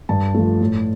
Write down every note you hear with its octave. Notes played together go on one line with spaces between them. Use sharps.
G2 A5
F3 A3
A2